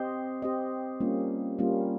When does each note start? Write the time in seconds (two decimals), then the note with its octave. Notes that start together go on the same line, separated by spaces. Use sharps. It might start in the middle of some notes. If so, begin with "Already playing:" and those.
Already playing: C4 G4 C5 D#5
0.42 C4 G4 C5 D#5
1.00 G3 A#3 C#4 F4
1.58 G3 A#3 C#4 F4